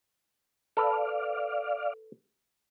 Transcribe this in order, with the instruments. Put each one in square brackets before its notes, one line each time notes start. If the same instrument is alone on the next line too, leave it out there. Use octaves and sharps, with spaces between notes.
[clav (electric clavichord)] A4 B4 [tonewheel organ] D5 F5